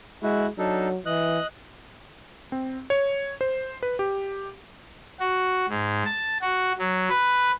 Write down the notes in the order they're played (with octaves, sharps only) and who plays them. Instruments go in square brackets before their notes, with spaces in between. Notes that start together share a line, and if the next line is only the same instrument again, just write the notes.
[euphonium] G#3 [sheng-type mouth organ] E4 F#4
[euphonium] F#3 [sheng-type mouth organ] D4 D#4 A4
[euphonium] E3 [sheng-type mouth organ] D#5 F#6
[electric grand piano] C4
C#5
C5
B4
G4
[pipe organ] F#4
G#2
A5
F#4
F#3
B4